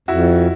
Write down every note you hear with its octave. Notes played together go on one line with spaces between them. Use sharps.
F2 E4 F#4